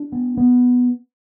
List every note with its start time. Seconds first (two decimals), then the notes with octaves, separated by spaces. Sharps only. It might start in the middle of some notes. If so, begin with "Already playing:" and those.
Already playing: D4
0.12 B3
0.37 B3